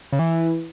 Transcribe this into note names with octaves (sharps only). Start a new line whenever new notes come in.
C#3
E3